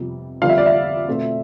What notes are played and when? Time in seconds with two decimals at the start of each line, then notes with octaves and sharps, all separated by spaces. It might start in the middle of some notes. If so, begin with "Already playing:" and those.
Already playing: F2 C3 G3 B3
0.41 F2 D3 G3 B3 F5
0.49 E5
0.58 D5
0.66 E5
1.08 B2 A3 C4